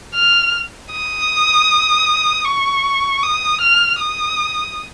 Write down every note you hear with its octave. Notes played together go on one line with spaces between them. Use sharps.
F6
D#6
C#6
D#6
F6
D#6